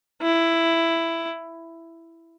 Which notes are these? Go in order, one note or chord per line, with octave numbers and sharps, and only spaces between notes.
E4